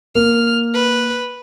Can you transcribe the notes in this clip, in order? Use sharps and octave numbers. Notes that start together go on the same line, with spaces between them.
A#3 F6
B4